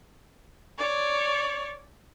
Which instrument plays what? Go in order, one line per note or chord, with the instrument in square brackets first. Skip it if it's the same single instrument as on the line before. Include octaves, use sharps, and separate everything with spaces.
[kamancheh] C#5 D5